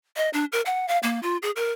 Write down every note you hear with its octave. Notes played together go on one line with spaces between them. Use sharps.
D#5
D4
A#4
F#5
F5
A#3
F4
G#4
A#4